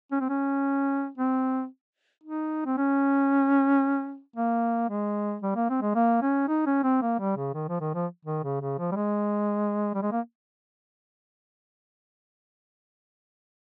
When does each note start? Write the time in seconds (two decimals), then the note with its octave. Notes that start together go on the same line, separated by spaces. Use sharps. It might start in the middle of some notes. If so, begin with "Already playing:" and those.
0.12 C#4
0.20 C4
0.29 C#4
1.18 C4
2.23 D#4
2.65 C4
2.77 C#4
4.36 A#3
4.89 G#3
5.42 G3
5.55 A#3
5.69 C4
5.82 G#3
5.95 A#3
6.22 C#4
6.48 D#4
6.66 C#4
6.83 C4
7.02 A#3
7.19 G3
7.37 C#3
7.54 D#3
7.68 F3
7.81 D#3
7.94 F3
8.25 D#3
8.43 C#3
8.61 C#3
8.79 F3
8.92 G3
8.96 G#3
9.94 G3
10.02 G#3
10.11 A#3